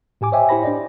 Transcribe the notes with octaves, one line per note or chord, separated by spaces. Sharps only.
A2 G4 G#5 D6
C5 C#5 D#5 E5 G5 G#5
E4 G4 C5 B5 A#6
D4 C5 D5 D#5